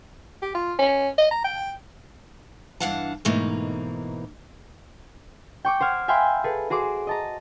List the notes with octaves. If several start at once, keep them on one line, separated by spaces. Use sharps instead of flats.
G4
F4
C#4
D#5
A#5
G5
G2 E3 D4 F5 F#5 A5
G#2 B2 E3 A3 A#3 D#4
G5 C#6 D6
C5 F#5 F6 G#6
E5 F5 G5 G#5 B5 C6
G#4 A4 B4
F#4 G#4 C5 D6
D#5 A5 A#5